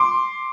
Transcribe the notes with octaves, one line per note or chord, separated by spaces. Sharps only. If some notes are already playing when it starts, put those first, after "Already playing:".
Already playing: C6 D6